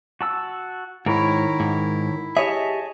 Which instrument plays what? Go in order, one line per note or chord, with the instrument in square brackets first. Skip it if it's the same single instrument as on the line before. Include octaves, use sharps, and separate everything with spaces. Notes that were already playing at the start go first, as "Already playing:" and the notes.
[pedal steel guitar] F#4 A5 E6
[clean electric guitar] G#2 [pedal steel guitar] D#3 A#4 C#5 [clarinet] E4
[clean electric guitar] G#2
[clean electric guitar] G4 C#5 E5 [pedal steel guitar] G#4 D#5 A5